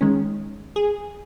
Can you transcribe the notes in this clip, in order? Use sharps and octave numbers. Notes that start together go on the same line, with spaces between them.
D#3 G#3 C#4
G#4